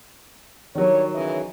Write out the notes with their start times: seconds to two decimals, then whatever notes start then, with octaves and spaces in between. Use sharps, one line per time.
0.75 D#3 F#3 G3 D4 C#5
1.14 C#3 E3 D#5